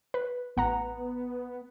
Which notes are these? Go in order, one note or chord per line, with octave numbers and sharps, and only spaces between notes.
B4
A1 B3 F#5 A#5